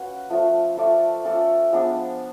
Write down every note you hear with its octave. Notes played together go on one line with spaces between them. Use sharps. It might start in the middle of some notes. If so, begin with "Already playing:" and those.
Already playing: C#4 F#4 B4 F5
F3 A3 F4
A3 F4 A4 D5
C#4 F4 A4 D5
F3 G#3 B3 D4